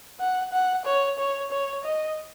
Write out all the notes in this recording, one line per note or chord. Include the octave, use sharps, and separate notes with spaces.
F#5
F#5
C#5
C#5
C#5
D#5